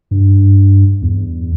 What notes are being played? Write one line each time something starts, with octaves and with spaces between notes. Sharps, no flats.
G2
E2